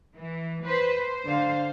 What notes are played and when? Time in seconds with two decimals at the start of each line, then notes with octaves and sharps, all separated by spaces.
0.15 E3
0.65 B4 C5
0.96 C5
1.26 D3 F5